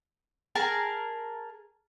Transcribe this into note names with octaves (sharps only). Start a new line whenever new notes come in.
G#4 A#4 A5 A#5